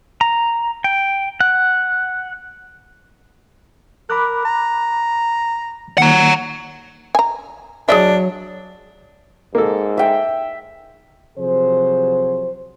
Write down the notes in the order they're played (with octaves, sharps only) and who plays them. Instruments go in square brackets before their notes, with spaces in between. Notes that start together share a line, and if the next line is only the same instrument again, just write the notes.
[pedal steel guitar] A#5
G5
F#5
[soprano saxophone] A#4 [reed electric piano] B5 D6 F#6
[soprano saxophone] A#5
[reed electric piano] D#3 A#3 [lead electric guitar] F#5 A#5
[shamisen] G#5 A#5
[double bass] F#3 [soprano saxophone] D4 [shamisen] G#4 D#5 E5
[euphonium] G#2 [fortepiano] A#3 A4
[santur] E5 G5
[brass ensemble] C3 F3 F#3 G#4 C5